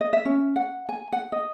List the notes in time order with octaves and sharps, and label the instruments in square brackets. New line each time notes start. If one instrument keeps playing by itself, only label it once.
[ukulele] D#5
E5
C#4
F#5
G#5
F#5
D#5